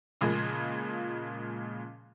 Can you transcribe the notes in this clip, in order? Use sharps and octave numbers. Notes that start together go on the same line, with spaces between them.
A#2 C#3 F3 G#3 A#3 G#4